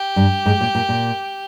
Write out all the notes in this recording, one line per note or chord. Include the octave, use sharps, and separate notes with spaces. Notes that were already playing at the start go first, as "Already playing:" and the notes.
Already playing: G4
G2
G#2
A#2
A#2
A#2